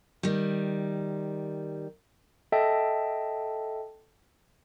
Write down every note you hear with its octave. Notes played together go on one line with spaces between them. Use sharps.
D#3 G3
A4 D#5 E5 G5 A5